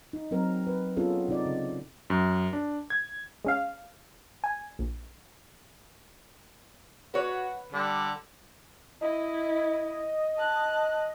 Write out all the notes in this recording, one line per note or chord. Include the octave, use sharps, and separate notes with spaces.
D#4
F#3 C4 A#4
B4
B3 C#4 F4 G#4 A4
C3 D#4 D5
C#3
F#2
D4
G#6
G#3 C#4 F5
G#5
A#1
F#4 B4 C#5
D3 G3
E4 D#5
A5 F#6